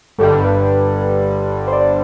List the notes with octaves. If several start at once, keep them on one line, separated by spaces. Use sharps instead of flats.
G1 G2 D3 G3 A4
B4
C5
D5